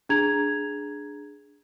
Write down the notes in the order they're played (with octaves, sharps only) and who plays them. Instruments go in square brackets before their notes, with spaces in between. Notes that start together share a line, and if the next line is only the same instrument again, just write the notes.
[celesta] D4 G#4 A#5 G#6 F7